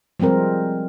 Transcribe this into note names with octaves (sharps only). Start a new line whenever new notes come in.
F3 G3 G#3 C4 A#4